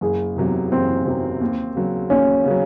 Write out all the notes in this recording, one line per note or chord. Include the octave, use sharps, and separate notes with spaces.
F#1 G#4
E2 C3 F#3
F#1 C4
E2 C3 F#3
D#2
C#3 F#3
D#2 C#4
C#3
F#3